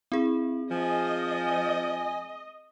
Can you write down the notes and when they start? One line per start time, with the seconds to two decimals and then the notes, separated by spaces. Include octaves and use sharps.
0.12 C4 E4 G#4
0.71 F3 D#5 G#5